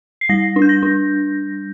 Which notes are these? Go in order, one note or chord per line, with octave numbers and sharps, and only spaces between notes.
C7
G3 A#6
D4
G6
A#6
D4